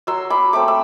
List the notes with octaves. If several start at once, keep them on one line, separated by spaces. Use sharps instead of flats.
F#3 C6 E6
B5 D6
A3 C4 B5 D6
E6